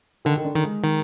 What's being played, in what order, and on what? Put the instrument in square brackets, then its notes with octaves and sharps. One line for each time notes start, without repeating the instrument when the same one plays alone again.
[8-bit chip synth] D3 [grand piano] D#3
[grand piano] D#3
D3
[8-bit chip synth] D#3
[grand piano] G#3
[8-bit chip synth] D#3